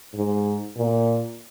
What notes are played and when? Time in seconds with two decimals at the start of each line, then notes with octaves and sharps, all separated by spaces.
0.14 G#2
0.77 A#2